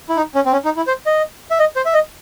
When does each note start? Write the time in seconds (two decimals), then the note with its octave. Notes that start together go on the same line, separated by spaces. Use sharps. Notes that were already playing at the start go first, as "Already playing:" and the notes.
0.09 E4
0.17 D#4
0.35 C#4
0.46 C4
0.52 C#4
0.65 D#4
0.76 E4
0.87 C5
1.06 D#5
1.51 E5
1.59 D#5
1.76 C5
1.86 E5
1.94 D#5